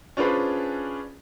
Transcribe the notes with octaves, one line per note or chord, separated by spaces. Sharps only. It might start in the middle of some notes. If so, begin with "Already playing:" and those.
C#4 D4 F4 G#4 B4 C5